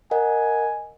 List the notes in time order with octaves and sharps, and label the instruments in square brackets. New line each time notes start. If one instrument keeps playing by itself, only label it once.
[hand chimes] A#4 D#5 F#5 [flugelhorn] G#5